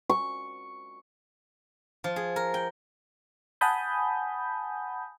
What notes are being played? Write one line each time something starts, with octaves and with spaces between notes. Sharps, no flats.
C#6
F3
G#4
A#4
G5
F#5 G#5 A5 B5 D#6 G6